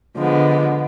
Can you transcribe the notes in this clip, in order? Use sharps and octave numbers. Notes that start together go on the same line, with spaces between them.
D3 F3 G#3 B3